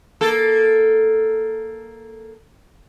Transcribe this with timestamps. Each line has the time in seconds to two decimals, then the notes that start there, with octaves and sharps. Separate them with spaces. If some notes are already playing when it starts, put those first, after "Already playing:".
0.21 A#3 A4